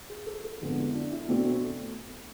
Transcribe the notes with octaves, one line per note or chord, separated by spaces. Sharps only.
G#4
A4
A4
F2 D3 G#3 B3 F4
E4
D4
E4
B2 A3 C4 D4